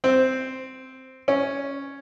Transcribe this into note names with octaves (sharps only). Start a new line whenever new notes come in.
C4
C#4